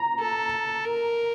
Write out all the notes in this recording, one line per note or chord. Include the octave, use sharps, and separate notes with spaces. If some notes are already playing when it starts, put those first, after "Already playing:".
Already playing: A#5
A4
A#4